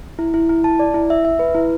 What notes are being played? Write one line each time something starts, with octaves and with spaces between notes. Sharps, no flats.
E4
E4
E4
A5
D5
E4
E5
E5
B4
E4